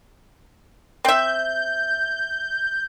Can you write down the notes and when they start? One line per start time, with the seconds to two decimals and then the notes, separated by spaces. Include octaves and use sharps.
1.05 C4 E5 G6